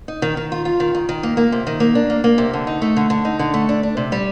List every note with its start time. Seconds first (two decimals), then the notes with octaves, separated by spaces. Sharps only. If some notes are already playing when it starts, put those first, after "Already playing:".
0.08 D#4
0.22 D#3
0.37 D#3
0.52 F4
0.65 F4
0.80 D#3
0.95 D#3
1.09 D#3
1.23 A#3
1.37 A#3
1.52 C3
1.67 D#3
1.80 A#3
1.95 D4
2.10 A#3
2.24 A#3
2.38 C3
2.53 D3
2.67 D#4
2.82 A3
2.97 D3
3.10 D3
3.25 D#4
3.39 D3
3.54 A3
3.69 D4
3.83 D4
3.97 C3
4.12 G3